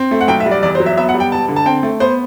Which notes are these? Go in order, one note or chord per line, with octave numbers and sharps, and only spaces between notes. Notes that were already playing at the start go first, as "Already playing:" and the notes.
Already playing: C4
A3
F#5
B1 G5
E5
G3
D5
E2 D5
C5
F#3
E5
B3 E5
F#5
G3
G5
E1 A5
D3
A5
C4 G5
A3
B3 C5